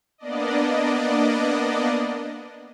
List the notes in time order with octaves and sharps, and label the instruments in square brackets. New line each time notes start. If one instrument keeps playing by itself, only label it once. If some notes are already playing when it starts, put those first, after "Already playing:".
[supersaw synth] A#3 B3 D4 D5 D#5